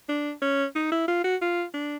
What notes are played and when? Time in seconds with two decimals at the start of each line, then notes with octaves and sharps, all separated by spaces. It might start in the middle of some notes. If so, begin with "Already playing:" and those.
0.09 D4
0.42 C#4
0.75 D#4
0.92 E4
1.08 F4
1.25 F#4
1.42 F4
1.74 D4